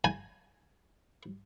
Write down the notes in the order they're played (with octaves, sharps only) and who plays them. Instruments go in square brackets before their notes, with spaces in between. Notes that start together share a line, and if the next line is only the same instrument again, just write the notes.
[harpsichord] G#5